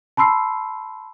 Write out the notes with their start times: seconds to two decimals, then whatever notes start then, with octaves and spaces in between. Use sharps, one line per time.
0.17 A5 B5 C6 E6 C7